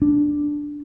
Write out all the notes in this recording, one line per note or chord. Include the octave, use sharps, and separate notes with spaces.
D4